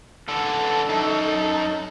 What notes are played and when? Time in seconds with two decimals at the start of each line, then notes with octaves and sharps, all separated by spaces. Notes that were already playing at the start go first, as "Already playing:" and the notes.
0.29 D3 E3 A4
0.89 F#2 D#4